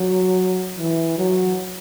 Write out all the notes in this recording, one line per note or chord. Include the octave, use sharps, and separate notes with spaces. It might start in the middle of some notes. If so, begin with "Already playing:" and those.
Already playing: F#3
E3
F#3